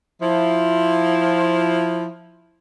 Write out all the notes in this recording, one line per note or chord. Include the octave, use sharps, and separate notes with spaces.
F3 E4